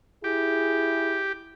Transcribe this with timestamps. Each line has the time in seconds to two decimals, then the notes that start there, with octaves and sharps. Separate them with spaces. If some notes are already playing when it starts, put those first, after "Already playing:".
0.24 E4 G4 G#4